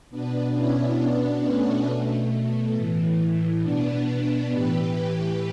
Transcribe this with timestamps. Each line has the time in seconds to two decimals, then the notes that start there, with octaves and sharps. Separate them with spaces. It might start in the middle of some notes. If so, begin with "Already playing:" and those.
0.10 B2 B3 D4
0.54 C#4 E4
0.98 B2 B3 D4
1.42 A3 C#4
1.87 B2 A3
2.74 A2 E3
3.62 B2 B3 D4
4.51 A2 E3 G4 B4